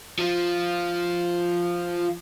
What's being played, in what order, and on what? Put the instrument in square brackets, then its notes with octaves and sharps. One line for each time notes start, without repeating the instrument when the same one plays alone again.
[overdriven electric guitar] F3 F4